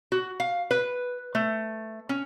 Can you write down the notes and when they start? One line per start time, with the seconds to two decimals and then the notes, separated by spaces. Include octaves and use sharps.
0.12 F#4
0.40 F5
0.71 B4
1.35 A3
2.09 C#4